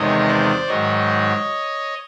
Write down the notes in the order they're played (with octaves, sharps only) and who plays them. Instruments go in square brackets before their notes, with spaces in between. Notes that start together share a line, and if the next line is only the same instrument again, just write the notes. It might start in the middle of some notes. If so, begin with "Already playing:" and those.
Already playing: [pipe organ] E2 C3 D#3 G#3 C#5 D#5
C5 D5
G#2 D#3 F#3 C#5 D#5